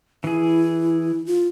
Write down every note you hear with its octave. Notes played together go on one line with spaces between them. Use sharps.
E3 E4 G#4
F4